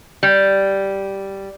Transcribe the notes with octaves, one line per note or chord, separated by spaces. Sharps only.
G3